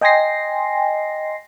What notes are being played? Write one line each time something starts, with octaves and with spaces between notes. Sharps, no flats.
D#5 G5 G#5 C6 A#6 C7